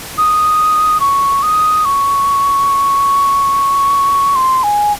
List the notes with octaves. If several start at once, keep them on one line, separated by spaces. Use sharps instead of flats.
D#6
C#6
D#6
C#6
C6
G#5